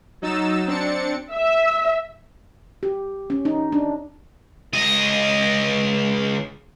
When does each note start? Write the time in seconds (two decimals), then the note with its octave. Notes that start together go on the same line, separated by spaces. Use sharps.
0.22 F#3 D#4 E6 A6 E7
0.67 C4 D4 A6 C#7
1.33 E5
2.83 G4
3.30 C#4
3.45 D#4
3.72 D4
4.73 C#2 D#5